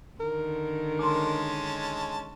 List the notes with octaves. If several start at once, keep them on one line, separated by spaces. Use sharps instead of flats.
D3 D#3 A#4
G#3 C#4 A5 C6 D6